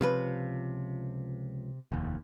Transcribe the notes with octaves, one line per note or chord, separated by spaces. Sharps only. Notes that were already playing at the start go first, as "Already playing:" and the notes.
C#2 C3 F3 B4
F1 D#2